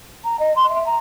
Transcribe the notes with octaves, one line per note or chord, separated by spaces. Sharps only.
A#5
D#5
C6
E5
A#5